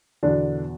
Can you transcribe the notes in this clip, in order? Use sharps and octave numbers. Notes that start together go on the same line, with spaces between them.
E2 B2 D3 D4